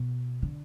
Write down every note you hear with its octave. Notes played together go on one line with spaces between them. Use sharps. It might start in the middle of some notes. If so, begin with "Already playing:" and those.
Already playing: B2
D3